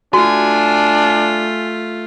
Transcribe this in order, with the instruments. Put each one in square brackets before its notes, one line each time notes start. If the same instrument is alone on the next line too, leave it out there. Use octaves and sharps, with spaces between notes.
[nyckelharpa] A3 F4 [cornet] D4 [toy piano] F#4 [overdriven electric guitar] G#5